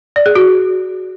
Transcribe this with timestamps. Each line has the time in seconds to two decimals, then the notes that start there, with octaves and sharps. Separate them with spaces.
0.16 D5
0.26 G#4
0.35 F#4